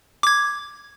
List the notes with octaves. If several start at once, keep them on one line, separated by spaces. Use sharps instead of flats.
D6 G#6